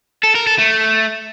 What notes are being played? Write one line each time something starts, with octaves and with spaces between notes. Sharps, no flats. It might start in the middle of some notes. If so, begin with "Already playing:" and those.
A4
A#4
A4
A3